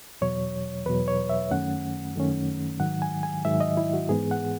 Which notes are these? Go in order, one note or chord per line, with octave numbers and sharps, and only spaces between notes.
E2 B2 F#3 C#5
E2 B2 F#3 B4
C#5
E5
F#2 D#3 A3 C#4 F#5
F#2 D#3 A3 C#4
G#2 D#3 F#3 F#5
G#5
G#5
G#2 D#3 F#3 E5
D#5
E4
F#4
G#2 E3 B3 G#4
F#5